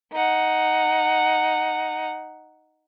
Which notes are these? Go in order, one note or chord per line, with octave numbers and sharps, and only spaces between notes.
D#4 F#5